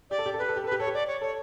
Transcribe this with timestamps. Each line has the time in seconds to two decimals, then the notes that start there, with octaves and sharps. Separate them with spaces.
0.10 G4 D5
0.19 A4
0.26 G4
0.34 A4
0.38 G4 B4
0.49 A4
0.56 G4
0.64 A4 B4
0.72 G4
0.80 A4 C#5
0.87 G4
0.94 D5
1.07 C#5
1.21 A4 C#5